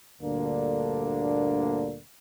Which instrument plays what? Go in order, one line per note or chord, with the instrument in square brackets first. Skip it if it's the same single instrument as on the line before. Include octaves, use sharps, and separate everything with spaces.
[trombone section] D2 G2 A#2 D3 A#3 D4